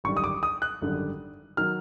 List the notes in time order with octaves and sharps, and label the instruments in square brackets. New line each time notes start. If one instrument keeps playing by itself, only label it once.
[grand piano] G#1 F#2 D3 G3 C#6
D#6
D6
D#6
F#6
G#1 F#2 D3 G3
D#3 F#3 F6